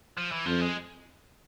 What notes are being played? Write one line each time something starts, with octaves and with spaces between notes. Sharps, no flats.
F3
E3
F2 F3
G#3